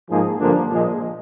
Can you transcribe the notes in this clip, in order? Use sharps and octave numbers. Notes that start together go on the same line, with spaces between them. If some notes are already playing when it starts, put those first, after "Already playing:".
G#2 F3 A#3 D#4 G#4
G2 D3 F3 A#3 D4
A#2 F3 G#3